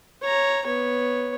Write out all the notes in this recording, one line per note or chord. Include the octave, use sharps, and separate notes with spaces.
C#5 A#5
B3 C#5